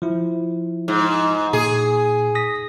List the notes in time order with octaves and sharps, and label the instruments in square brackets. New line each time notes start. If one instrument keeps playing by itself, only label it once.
[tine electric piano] F3 E4
[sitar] G#2
[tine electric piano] A#2 [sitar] G#4
[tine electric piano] D#6 A#6 B6